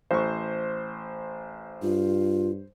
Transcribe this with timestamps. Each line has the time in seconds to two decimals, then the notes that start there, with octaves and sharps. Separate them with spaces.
0.11 A1 C5 C#6
1.83 G2 F4